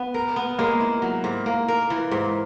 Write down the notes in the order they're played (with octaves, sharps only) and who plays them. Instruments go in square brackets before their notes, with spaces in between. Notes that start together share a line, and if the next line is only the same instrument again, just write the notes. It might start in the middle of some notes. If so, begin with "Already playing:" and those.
Already playing: [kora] B3
A#4
B3
[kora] G#3 [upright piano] A#3
[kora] E4
F#3
G#2
A#3
A#4
E3
G#2